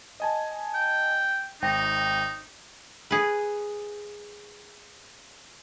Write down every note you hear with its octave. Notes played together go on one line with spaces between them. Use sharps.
D#5 G#5 A5
G5
G#1 D#4 G5 A#6
G#4 B4